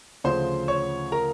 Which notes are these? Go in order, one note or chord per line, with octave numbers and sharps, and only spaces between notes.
D2 C#3 F3 C5 C6
C#5 C#6
A#4 A#5